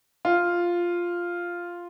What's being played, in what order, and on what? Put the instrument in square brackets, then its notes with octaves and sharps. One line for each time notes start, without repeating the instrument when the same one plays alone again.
[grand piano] F4